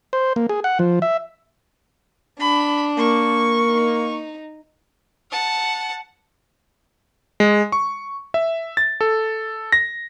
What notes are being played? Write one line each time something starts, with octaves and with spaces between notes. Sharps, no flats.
C5
A#3
G#4
F#5
F3
E5
D4 B5
A#3 C#6
D#4
F#5 A5
G#3
C#6
E5
A6
A4
A#6